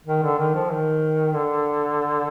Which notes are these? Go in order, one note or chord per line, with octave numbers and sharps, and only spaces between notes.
D#3
D3
D#3
F3
D#3
D3